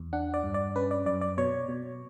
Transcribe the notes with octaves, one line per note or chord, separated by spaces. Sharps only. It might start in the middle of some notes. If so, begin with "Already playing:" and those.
Already playing: E2
D4 F#5
D5
G2
D5
C#4 B4
D5
F#2 D5
D5
B2 C#5
B2